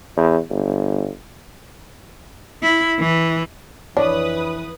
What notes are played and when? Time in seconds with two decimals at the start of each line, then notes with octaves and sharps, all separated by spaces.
0.16 E2
0.50 G1
2.63 E4
2.99 E3
3.97 F2 E3 D4 B4 C#5 D#6